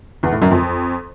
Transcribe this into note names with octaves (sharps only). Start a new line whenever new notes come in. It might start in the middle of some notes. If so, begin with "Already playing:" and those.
E2
A2
F#2
F2